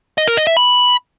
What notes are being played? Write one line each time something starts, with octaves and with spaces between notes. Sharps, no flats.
D#5
A#4
D#5
E5
B5